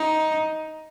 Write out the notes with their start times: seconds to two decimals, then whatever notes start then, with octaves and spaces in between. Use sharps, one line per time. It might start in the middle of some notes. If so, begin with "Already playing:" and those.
Already playing: D#4